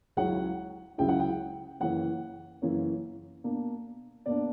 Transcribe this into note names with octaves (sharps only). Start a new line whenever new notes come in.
C#2 C#3 F#3 C#4 E4 F#5
C#2 C#3 F#3 C#4 E4 G5
F#5
G5
F#2 C#3 E3 A#3 C#4 F#5
F#2 C#3 E3 A#3 C#4
B2 A#3 D4
B2 A#3 D4 D5